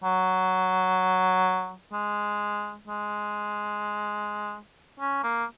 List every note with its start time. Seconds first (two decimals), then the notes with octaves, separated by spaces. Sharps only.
0.04 F#3
1.93 G#3
2.88 G#3
5.00 C#4
5.24 A#3